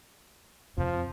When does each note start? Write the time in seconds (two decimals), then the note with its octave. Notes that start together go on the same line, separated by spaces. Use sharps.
0.78 F2 C3 F3